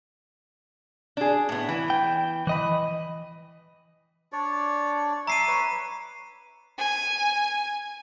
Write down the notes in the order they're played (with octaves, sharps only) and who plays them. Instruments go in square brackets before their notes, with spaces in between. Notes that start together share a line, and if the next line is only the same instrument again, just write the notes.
[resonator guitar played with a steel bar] D4 G#4
A2 B3
E3
[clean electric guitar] G5
E3 D#5 B5
[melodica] D4 C#5 D5
[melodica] E5 D6 [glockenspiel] A#5 C7 D#7
[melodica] B4 C#5
[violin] G#5